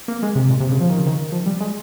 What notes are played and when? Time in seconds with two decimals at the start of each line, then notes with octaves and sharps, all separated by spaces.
0.08 A#3
0.23 G#3
0.35 C3
0.49 A#2
0.60 C3
0.71 C#3
0.80 F3
0.89 D#3
0.98 C#3
1.06 D#3
1.32 F3
1.46 G3
1.60 G#3